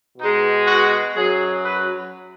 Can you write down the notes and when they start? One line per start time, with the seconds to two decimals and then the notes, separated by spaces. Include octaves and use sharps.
0.18 B2 G#3 D#4
0.66 F#4
1.15 F#2 F#3 G#4
1.63 B4